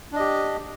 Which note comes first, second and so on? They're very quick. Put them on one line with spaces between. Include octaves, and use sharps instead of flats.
D4 D#5 G4